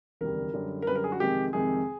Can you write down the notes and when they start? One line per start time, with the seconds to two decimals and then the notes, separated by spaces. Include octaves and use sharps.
0.21 E1 D2 C3 D#3 G3 A#4
0.54 F#2 D3 G3
0.82 A#4
0.87 F#2 D3 G3 B4
0.95 A#4
1.04 G#4
1.12 F#4
1.20 F2 C3 D#3 G#3 G4
1.53 F2 C3 D#3 G#3 G#4